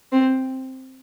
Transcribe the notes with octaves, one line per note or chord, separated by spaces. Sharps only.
C4